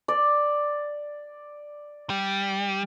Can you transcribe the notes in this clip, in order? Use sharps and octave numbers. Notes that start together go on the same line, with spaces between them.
D5
G3